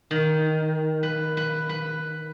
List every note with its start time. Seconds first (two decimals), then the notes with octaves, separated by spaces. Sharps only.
0.11 D#3
1.03 B4
1.37 B4
1.69 B4